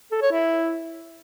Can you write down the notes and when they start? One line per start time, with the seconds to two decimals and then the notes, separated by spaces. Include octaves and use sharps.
0.12 A4
0.22 C#5
0.32 E4